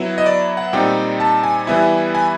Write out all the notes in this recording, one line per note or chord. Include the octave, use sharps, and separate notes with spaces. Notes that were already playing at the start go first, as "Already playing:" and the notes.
Already playing: F#3 B3 E4
D#5
D5
F#5
A#2 G3 C4 D#4 G5
A5
G#5
E3 G3 B3 E4
G#5